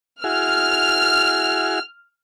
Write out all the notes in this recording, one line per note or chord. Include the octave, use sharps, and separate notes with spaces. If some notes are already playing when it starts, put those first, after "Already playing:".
E4 F#4 G#4 F6